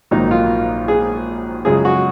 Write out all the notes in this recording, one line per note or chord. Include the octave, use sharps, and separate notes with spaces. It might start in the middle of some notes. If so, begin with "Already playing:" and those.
A#1 G#2 D#3 F#3 A#3 D#4
F4
G#4
F#2 C#3 F3 G#3 G#4
F#4